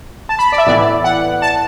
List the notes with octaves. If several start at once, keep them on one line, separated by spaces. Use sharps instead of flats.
A5
B5
D5
E5
A2 E3 B3 E4 D5
F#5
A5